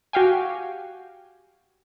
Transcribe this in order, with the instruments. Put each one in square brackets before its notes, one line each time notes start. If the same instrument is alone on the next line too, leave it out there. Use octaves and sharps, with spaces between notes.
[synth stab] F#4 G4 F5 G5 G#5